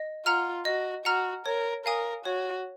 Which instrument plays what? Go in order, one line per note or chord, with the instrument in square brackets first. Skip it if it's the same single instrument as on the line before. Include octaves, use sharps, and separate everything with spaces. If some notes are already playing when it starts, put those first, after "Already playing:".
Already playing: [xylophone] D#5
[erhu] F4 [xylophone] F#5 A#5 F6
[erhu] F#4 [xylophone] D#5
[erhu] F#4 [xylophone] F#5 A#5 F6
[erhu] A#4 [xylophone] C#5
[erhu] A#4 [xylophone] F5 G#5 D#6
[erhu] F#4 [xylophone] C#5